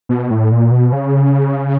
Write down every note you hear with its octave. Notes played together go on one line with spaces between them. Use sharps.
B2
A2
A#2
B2
C#3